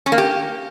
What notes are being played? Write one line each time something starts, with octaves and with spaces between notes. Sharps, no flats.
C#4
A#3
G4